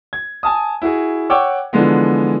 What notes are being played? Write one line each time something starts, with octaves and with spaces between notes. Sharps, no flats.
G#6
G#5 A5 D#6
E4 F#4 G#4
C#5 F#5 G5 C#6 D6 E6
D3 E3 F3 G#3 B3